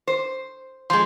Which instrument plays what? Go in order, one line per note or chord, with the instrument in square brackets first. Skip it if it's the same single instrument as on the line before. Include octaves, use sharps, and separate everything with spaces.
[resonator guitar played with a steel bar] C5
[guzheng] F3 G#3 [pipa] C6